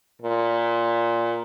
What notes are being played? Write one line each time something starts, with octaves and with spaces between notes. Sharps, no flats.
A#2